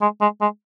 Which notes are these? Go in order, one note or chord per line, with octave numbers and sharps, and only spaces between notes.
G#3
G#3
G#3